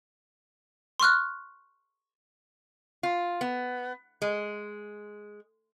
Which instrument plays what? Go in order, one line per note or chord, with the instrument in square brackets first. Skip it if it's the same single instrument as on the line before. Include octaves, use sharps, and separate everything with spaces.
[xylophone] C6 C#6 F6 F#6
[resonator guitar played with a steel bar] F4
B3
G#3